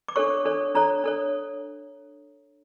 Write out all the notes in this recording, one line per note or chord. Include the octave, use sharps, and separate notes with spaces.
D6
D4 A4 C#5 C#6
D4 A4 C#5
D4 A4 C#5 A#5
D4 A4 C#5